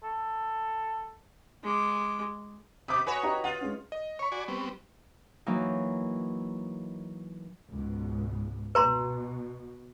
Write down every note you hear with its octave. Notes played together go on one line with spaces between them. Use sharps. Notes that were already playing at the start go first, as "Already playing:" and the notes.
A4
G#3 D6
B2 D6 D#6
F#4 B4 C#5 G#5
G4 D#5 A#5
F4 F#5
G#3 C#4
D#5
C#5 B5 C#6
F#4 D5 G#5
G3 B3 C4
E3 F#3 A#3 D#4
C#2 G#2 B2
B2 B4 A#5 C6